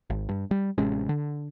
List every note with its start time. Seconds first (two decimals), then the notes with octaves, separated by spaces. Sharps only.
0.10 G#1
0.29 G2
0.51 G3
0.78 A1 C3 G#3 C#4
1.09 D3